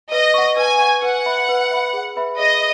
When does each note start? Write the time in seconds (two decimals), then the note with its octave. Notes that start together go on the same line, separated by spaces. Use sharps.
0.12 B4 D#5
0.34 F#5 C#6
0.57 B4 G#5
0.80 F#5 C#6
1.02 B4 F#5
1.26 E5 B5
1.49 B4
1.71 E5 B5
1.93 G#4
2.16 B4 E5 B5
2.39 G#4 D#5